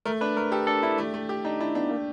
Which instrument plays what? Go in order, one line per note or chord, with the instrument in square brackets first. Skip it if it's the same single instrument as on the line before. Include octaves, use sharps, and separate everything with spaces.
[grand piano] A3 [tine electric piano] A#4
[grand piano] D4 [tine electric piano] B4
[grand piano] A3 [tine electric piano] A#4
[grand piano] G4 [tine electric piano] A4
[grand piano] D4 [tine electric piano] A4
[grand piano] D4 [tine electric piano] E4
[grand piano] A3
A3
G4
[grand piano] D4 [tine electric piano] D#4
[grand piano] D4 [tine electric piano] E4
[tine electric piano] B3 [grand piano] D4
[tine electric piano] A#3